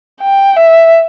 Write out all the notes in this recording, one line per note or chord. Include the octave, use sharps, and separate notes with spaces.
G5
E5